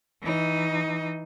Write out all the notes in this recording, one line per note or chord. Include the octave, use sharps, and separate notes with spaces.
E3 D#4